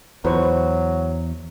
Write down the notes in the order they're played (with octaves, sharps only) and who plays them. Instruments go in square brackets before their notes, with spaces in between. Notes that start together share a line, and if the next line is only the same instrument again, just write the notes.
[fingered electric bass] E2 [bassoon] F#3 [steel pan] B4 C5 C#6